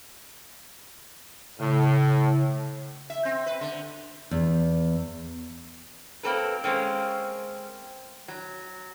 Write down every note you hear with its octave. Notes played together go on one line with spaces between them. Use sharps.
A2 C#3
E5
C4
B4
D3
E2
F#3 A#3 C4 A4 B4
G#3 A#3 C4 C#4
F#3